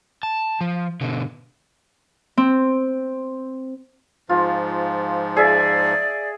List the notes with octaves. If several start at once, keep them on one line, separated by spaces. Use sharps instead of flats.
A5
F3
B2 D3
C4
G#2 F3 F4
G#4 D5 E5